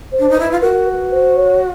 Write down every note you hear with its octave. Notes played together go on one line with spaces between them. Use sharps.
C5
D4
D#4
E4 B4
F4
F#4 A#4
B4
C5
C#5